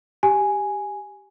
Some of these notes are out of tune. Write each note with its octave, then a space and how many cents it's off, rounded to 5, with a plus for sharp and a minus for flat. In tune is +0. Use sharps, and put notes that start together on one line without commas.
G4 +0 G#5 +0